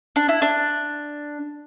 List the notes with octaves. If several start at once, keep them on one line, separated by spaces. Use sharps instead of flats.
D4
E4
D4